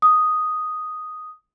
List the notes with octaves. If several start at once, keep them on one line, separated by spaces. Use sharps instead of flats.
D#6